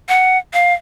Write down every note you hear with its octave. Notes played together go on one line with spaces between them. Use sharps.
F#5
F5